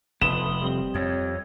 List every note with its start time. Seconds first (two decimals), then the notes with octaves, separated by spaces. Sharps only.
0.22 F1 A3 B3 B5 C6 D#6 E7
0.62 G3 C4
0.95 F2 C#5